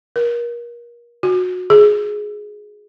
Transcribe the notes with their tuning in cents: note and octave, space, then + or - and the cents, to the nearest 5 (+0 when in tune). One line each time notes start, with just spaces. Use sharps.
A#4 +30
F#4 -25
G#4 +10